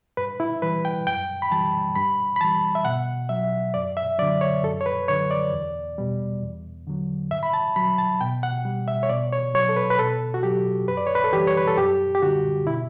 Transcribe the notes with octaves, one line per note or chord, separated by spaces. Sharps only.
G2 B4
E4
E3 G3 B4
G5
F#2 G5
B5
E3 G3 A5
G2 B5
B5
E3 G3 A5
E5
B2 F#5
F#3 E5
F#2 D5
E5
D3 F#3 D5
C#5
F#2 A4
C#5
B4
D3 F#3 C#5
D5
E2
B2 G3
E2
D3 F#3
G2 E5
B5
A5
F#3 B5
A5
B2 G5
F#5
G3
E5
C#5
B2 D5
C#5
F#3 C#5
A4
B4
B4
B2 A4
F#4
F#3 G4
F#2 B4
D5
C#5
B4
A4
E3 G3 G4
C#5
B4
A4
F#2 G4
G4
D3 G3 F#4
B2 E4